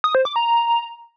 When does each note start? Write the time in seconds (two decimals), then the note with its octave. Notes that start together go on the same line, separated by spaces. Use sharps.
0.04 D#6
0.15 C5
0.25 D6
0.36 A#5